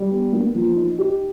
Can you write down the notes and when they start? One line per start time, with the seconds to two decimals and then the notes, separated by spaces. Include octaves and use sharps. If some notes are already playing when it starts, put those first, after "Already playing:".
Already playing: G3
0.11 B3
0.33 A#3
0.55 F3
0.76 D#4
0.99 G4